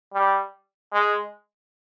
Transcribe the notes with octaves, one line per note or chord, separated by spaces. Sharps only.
G3
G#3